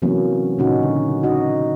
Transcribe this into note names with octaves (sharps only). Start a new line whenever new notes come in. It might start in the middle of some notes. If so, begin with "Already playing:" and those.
C3 E3 F#3 A#3 B3 C#4
A#2 C#3 C#4 D#4 F#4
D3
D#4 F#4 D#5